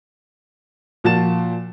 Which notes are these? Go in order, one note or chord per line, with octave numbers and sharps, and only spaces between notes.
A#2 F3 F#4 A5 A6 E7